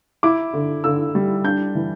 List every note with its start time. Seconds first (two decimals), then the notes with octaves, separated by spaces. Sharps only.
0.23 E4 D6
0.53 D3
0.84 D3 E6
1.15 G3
1.44 D4 G6
1.75 E3